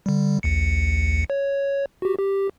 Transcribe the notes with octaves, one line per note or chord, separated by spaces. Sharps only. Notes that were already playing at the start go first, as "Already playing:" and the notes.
D3 G3
A#1 D#2 C#7
C#5
F#4 G4
G4